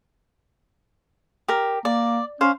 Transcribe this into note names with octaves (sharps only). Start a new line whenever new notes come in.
G4 A#4
A#3 D5
C#4 C5 F5